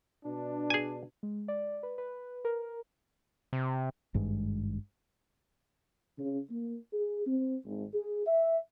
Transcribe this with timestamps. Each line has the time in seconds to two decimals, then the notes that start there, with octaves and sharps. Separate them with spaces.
0.25 B2 D4
0.70 G#4 G#5
1.23 G#3
1.48 D5
1.83 B4
1.98 B4
2.45 A#4
3.53 C3
4.14 G#1 G2 G#3
6.18 C#3
6.50 A#3
6.93 G#4
7.26 C4
7.64 G#1
7.94 G#4
8.26 E5